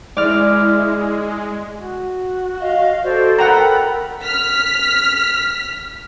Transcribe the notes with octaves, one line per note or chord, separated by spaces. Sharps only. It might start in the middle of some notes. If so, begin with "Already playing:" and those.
G#3 E4 D5 F6
F#4
D#5 F5
F#4 A4 C5 D5
A#4 F#5 G5 A#5 B5
F6 B6